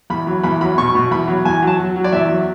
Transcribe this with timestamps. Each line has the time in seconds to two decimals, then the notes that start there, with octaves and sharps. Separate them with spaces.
0.10 E2 B5
0.27 F#3
0.43 E2 B5
0.61 F#3 B5
0.78 B2 C#6
0.95 B2
1.11 E2 B5
1.28 F#3
1.45 E2 G#5
1.63 F#3 A5
1.79 F#3
1.96 F#3
2.04 D5
2.12 E2 E5
2.29 F#3